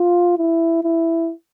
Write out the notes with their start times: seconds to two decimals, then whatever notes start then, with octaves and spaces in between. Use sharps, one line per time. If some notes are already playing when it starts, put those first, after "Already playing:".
Already playing: F4
0.38 E4
0.84 E4